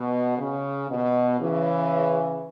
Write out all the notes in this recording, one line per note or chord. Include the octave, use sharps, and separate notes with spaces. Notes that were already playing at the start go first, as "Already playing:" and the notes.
Already playing: B2
C#3
B2
C#3 E3